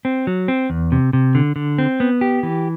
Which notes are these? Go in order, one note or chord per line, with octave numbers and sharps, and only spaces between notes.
C4
F#3
C4
E2
C3
C3
D3
D3
C4
B3
G4
E3